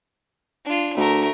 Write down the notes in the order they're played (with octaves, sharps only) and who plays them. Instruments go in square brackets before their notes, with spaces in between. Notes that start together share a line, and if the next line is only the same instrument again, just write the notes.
[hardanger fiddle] D4 F4
[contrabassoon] D2 [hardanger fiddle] A3 A#4